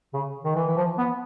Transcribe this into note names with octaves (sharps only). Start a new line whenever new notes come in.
C#3
D#3
E3
E3
F3
B3